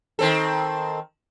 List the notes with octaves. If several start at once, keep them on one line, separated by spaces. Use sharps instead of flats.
D#3 C4 A4